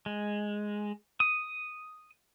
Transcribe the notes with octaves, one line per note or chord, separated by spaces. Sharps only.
G#3
D#6